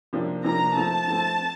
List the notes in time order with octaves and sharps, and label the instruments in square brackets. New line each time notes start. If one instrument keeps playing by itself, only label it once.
[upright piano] C3 F3 A#3 D4
[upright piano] C3 F3 A#3 D4 [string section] A#5
[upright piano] F3 A3 C4 [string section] A5
[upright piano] F3 A3 C4